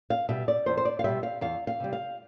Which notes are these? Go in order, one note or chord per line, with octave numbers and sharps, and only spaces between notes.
F5
B2 G3 E5
D5
E2 C5
C5
D5
F5
B2 G3 E5
F5
E2 F5
F5
C3 G3
F5